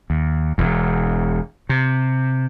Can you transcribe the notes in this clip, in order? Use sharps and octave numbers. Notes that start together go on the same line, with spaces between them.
D#2
E1 E2
C3